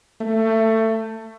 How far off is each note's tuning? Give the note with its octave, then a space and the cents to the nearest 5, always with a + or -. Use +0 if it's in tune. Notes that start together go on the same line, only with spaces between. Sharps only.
A3 +20